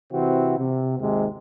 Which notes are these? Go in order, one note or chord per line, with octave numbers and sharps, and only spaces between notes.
C3 E3 C4 E4 F#4
C3
G#1 D#2 G#2 C3 G#3